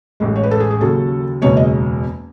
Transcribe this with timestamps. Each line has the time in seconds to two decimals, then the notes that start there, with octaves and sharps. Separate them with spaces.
0.20 A1 A2 G#3
0.36 C#5
0.43 B4
0.51 A4
0.60 G#4
0.71 G#4
0.81 D#2 C#3 F#3 A4
1.41 F#1 E2 B2 G#3 C#5
1.57 D#5